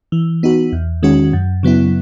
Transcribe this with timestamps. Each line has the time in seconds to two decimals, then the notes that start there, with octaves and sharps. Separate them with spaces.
0.12 E3
0.43 B3 D#4 F#4
0.73 E2
1.03 D#3 G#3 C#4 F#4
1.33 F#2
1.63 C#3 F#3 B3 E4